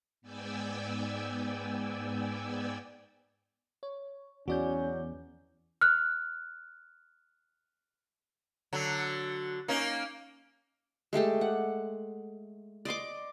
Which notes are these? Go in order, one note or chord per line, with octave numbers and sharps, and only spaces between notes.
G#2 B3 D5 G5 G#5 E6
C#5
E2 F#3 C#4 F#4 D5 G6
F6 F#6
D3 F#3
A#3 C#4 D#4
G#3 A3 G4 A4
F#5
D5 D#5 C6 D6